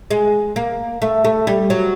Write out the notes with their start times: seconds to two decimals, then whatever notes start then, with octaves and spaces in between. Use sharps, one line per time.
0.11 G#3
0.56 A#3
1.02 A3
1.25 A3
1.47 G3
1.70 F#3